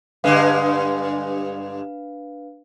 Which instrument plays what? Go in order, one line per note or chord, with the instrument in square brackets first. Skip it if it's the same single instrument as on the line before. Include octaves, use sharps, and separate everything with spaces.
[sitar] G2 D3 G#3 [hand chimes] D4 B4 F5